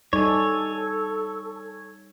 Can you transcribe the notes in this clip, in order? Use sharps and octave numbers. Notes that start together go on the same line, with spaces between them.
G3 D#4 A4 C#5 D5 G#5